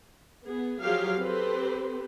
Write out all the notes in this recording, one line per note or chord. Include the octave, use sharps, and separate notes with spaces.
B3 G#4
F3 F#3 G4 G#4 F5
C4 G4 A4 B4 C5